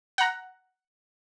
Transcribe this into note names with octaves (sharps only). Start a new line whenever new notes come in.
F#5 A#5